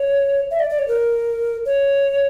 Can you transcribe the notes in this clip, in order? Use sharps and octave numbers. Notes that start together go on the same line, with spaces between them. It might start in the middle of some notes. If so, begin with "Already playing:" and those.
Already playing: C#5
E5
D5
D5
C#5
A#4
C#5